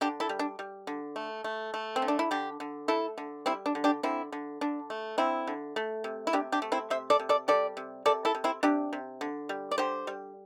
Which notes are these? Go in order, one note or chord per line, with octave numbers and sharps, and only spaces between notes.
D3 D4 G4
E4 A4
G3
D4
G3
D3
A3
A3
A3
C4
D3
D4
E4
D3 D4 G4
D3
A3 E4 A4
D3
G3 C4 E4
D4
D3
D4 G4
D3 C4 E4
D3
D3 D4
A3
D3 C4 E4
D3
A3
C3
E4
C3 D4 G4
D4 G4
A3
C4 E4
C3 C5 E5
A4 D5
C3
A4 D5
G3 A4 D5
C3
C3 A4 D5
E4 A4
C3
C4 E4
C3 D4 G4
C3
D3
G3
D5
D3 G4 C5
G3